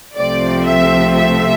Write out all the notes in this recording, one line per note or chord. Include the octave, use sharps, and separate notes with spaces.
C2 C3 F3 A3 C4 D5
E5
E5